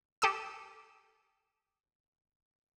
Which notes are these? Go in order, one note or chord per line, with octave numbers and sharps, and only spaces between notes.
G4 A4 D#6 E6